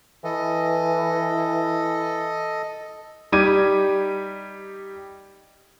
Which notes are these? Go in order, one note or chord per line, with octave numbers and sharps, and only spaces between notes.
E3 A4 D#5
G3 D#4 G4 D6 G#6 D#7